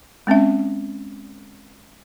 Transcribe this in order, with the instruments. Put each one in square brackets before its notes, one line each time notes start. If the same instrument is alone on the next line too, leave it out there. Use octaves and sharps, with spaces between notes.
[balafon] G#3 C4 C#4 E5